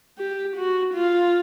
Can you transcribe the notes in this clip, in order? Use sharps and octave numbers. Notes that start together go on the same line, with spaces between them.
G4
F#4
F4